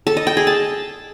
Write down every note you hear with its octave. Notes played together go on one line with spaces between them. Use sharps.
A4
D#5
G5
G#4
A5